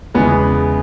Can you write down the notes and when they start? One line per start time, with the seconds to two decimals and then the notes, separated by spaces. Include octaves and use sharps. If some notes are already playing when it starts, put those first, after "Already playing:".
0.15 E2 C#3 E3 G#3 B3